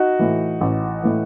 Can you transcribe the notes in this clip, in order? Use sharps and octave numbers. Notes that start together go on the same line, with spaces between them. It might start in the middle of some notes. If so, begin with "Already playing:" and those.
Already playing: D#4 F#4
A2 E3
A1
A2 E3